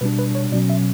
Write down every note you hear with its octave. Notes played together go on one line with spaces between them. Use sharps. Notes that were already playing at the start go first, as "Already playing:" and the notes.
B2 G3 D4 B4
B4
C#5
B2 F#3 C#4 D5
E5